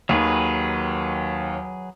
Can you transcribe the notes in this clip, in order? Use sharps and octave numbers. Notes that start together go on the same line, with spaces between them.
D#2 D#3 F#3 G#4 B4